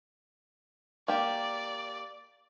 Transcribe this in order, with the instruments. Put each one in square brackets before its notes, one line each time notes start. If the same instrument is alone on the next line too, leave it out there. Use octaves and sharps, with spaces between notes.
[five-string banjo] A#3 G4 [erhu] D5